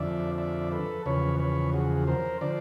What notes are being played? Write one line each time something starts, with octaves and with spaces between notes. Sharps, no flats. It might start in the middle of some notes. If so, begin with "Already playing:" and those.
Already playing: F2 D3 F3 D5 E5
D5 E5
A4 B4
E2 C#3 F3 B4 C#5
B4 C#5
F#4 G#4
A#4 C5
D3 F3 C5 D5